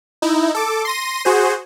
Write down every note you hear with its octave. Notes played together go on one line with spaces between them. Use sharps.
D#4 E4
A4 D6
C6 A#6 D#7
F#4 G#4 C5